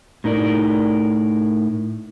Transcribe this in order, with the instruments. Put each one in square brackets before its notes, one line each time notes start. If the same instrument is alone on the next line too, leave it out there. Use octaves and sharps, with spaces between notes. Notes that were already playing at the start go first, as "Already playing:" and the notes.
[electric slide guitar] A2 D#4 A#4 D5